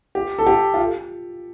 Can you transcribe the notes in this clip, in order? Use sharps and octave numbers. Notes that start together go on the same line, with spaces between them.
G4
A4
G4
F4